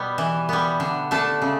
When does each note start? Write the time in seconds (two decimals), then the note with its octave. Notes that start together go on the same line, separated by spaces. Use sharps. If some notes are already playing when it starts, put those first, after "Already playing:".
Already playing: B2 G3 B3
0.18 E3
0.49 G3 B3
0.80 D3
1.11 A3 D4 A4
1.42 C#3